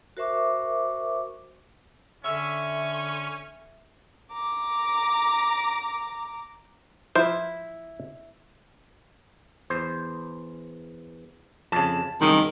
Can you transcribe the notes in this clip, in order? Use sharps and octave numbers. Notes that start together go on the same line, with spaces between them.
F#4 A#4 C5 E5 C#6 D6
D3 C#4 E5 C#6 E6
A#5 D6
F3 E4 C5
E2 C5
F2 C#3 A5
C2 F#2 D#3 G#3